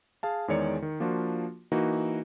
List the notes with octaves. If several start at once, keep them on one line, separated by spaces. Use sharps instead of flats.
G#4 F5 A5
E2 D#3 G#3 C#5 D5 C#7
D#3
F3 A#3 D4 F4 F#4
E3 A#3 D#4 F#4